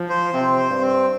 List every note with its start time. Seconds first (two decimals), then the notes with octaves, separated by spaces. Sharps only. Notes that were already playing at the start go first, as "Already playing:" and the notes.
Already playing: F3
0.09 C5
0.33 C3 C4
0.57 C5
0.70 G2
0.81 C4